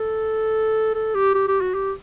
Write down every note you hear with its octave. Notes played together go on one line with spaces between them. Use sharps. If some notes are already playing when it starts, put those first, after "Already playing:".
Already playing: A4
A4
G4
G4
G4
F#4
G4